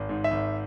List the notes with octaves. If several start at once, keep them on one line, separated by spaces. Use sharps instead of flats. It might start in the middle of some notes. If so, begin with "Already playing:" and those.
Already playing: G#1
G#2
E5
G#1